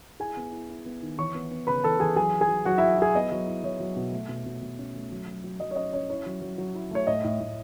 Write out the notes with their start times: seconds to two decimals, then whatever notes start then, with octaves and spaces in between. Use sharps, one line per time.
0.20 E4 G#4 G#5
0.37 B3
0.52 E4
0.70 E4
0.86 B3
1.02 D#3
1.19 E3 C#5 C#6
1.34 B3
1.51 B3
1.67 C#3 B4 B5
1.84 E3 A4 A5
2.00 E3 G#4 G#5
2.16 F#3 G#4 G#5
2.33 E4
2.41 G#4 G#5
2.49 F#3
2.65 F#3 F#4 F#5
2.78 F#3 E4 E5
2.98 E4 G#4 G#5
3.15 B3 D#5
3.32 F#3
3.47 E4
3.63 F#3 C#5
3.80 F#3
3.96 B2
4.12 A3
4.29 B2
4.46 B2
4.63 B2
4.79 C#4
4.95 A3
5.12 F#3
5.27 F#3
5.44 F#3
5.60 F#3 D#5
5.71 C#5
5.76 C#4 D#5
5.93 C#4 C#5
6.10 E4 C#5
6.26 F#3
6.41 F#3
6.58 F#3
6.75 E4
6.91 A3 C#5
7.07 A2 D#5
7.24 A2
7.41 A2